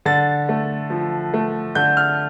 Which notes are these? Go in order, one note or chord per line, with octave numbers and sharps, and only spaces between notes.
D3 A6
A3
F3
A3
D3 G6
F6